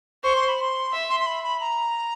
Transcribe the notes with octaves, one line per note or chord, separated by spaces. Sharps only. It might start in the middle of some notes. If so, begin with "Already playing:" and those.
C5 C#6
C6
B5
C6
E5
C6
C6
B5
B5
A#5